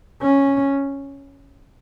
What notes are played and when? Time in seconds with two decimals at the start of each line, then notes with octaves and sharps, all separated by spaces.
0.21 C#4